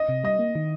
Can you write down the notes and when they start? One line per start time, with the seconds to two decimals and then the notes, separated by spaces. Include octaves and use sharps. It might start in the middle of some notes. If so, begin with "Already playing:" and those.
Already playing: D#5
0.09 C3
0.24 G3 D#5
0.39 A#3
0.55 D#3